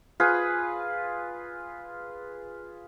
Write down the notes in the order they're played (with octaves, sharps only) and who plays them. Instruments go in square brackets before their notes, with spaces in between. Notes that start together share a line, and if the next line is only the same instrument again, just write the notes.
[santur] F4 G#4 B4